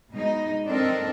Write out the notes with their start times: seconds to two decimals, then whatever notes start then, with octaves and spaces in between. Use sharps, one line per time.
0.11 B2 G#3 D#4
0.67 C4 D4 D#4 A4 A#4